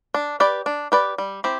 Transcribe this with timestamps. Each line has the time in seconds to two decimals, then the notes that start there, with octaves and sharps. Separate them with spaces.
0.14 D4
0.40 G4 B4 D5
0.66 D4
0.92 G4 B4 D5
1.18 G3
1.44 C4 E4 G4